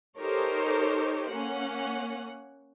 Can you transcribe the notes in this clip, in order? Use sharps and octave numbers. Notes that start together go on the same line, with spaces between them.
D#4 G4 A4 A#4 C5 C#5
A#3 C#4 F#5